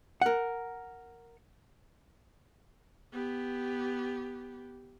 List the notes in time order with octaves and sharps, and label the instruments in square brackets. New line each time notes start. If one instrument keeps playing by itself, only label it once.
[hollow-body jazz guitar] A#4 F#5
[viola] B3 G4